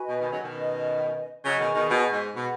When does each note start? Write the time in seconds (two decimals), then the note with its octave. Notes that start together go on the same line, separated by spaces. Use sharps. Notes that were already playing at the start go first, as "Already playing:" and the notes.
Already playing: F#4 B4 D#5 G#5
0.09 B2
0.20 B2 D#3
0.31 C#3 F#3
0.42 B2 D#3
0.54 C#4 B4 D#5
1.44 C#3 F#3 G#4 D#5 G#5 C#6
1.60 B2 D#3
1.75 B2 D#3
1.90 B2
2.12 G#2
2.35 B2 G#4 B4 F#5 B5